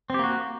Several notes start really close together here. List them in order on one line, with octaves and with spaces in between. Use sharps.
C4 G4 A#3 F#4